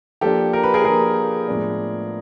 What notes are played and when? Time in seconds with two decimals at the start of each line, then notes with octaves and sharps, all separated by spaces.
0.21 F3 A#3 D4 G4 A4
0.53 A#4
0.63 B4
0.74 G#4 A#4
0.84 F3 A#3 D4 G#4 A#4
1.47 A2 F3 G#3 B3 D4